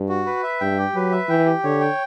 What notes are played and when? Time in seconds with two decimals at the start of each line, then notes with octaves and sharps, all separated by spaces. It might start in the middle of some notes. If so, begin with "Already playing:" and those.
Already playing: G2
0.09 F#4
0.26 B4
0.43 E5
0.60 G2 G5
0.78 G4
0.95 F#3 B4
1.12 E5
1.29 E3 G5
1.46 G4
1.64 D3 C#5
1.80 G5